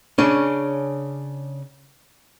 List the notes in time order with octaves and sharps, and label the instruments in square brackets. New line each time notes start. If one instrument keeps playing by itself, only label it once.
[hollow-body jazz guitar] C#3 C#4 D4